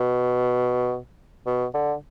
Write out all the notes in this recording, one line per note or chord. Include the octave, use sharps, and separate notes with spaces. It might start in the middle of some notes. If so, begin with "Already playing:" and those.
Already playing: B2
B2
D3